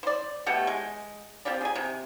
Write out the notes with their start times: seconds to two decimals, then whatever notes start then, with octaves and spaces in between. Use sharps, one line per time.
0.03 C5 D5
0.46 B2 A3 G4 F#5
0.67 G#3
1.45 C4 F4 G4 D5
1.61 G#4 G#5
1.75 C3